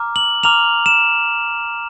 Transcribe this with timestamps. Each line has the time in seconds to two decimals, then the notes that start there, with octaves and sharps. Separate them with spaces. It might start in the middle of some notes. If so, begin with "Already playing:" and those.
Already playing: A#5 D6 F6
0.16 F#7
0.43 A#5 D6 F6 F7
0.86 E7